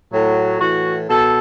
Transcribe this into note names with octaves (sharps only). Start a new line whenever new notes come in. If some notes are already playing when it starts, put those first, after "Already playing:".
A2 F#3
A2 E3 F#4
B2 A4